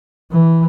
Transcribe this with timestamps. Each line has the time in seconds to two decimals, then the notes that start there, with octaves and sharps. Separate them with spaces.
0.32 E3